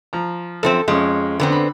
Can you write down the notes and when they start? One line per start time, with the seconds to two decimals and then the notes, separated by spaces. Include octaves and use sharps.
0.13 F3 A#5
0.63 F#2 F3 C4 A4
0.88 F2 G#3 C#4
1.40 D3 B3 C4
1.52 B5